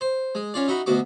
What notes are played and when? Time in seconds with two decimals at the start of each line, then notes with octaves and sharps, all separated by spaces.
0.01 C5
0.35 G#3
0.54 C#4 F4 D5
0.68 D#4 F#4 E5 B5
0.86 D2 B2 F#4 D6